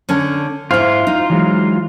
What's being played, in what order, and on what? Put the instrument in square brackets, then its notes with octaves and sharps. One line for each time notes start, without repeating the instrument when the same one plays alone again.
[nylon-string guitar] D3 C#4 D4
[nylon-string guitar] G#2 E4 [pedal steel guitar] F4
[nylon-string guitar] D#4
[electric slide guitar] E3 F#3 G#3